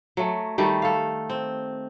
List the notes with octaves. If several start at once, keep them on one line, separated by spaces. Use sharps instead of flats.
F#3 A3
D#3 G3 A3
A4 F5
C4